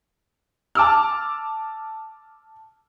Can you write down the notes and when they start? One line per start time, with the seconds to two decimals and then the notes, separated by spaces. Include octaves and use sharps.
0.75 A5 D6 E6 F6